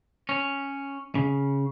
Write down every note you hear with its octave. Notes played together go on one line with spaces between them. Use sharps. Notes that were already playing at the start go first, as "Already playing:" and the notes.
C#4
C#3